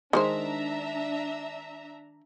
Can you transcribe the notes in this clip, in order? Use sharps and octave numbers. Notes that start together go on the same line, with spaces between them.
D#3 G#3 D4 C5 E5 A#5